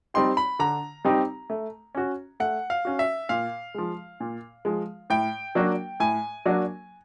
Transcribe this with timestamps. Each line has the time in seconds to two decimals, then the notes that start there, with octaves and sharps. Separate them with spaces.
0.14 G3 C4 D#4 G4 C6
0.37 B5
0.59 D3 A#5
1.05 G3 C4 D#4 G4
1.50 A3
1.95 C#4 F#4
2.40 A3 F#5
2.70 F5
2.85 C#4 F#4
2.99 E5
3.29 A#2 F5
3.74 F3 G#3
4.20 A#2
4.65 F3 G#3
5.10 A2 G5
5.55 F#3 A#3 D4 F#4
6.00 A2 G#5
6.46 F#3 A#3 D4 F#4